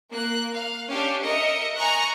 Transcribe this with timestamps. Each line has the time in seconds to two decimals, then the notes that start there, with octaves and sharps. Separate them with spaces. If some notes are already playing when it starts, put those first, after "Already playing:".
0.12 A#3 F#6
0.54 F5
0.90 C#4 D4 G4 F5
1.25 A#4 D#5 E5 C#7
1.77 G#5 A#5 C#6 F#6